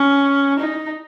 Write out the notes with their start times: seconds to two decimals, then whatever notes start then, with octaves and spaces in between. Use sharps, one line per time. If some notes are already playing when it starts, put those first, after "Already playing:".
Already playing: C#4
0.59 D#4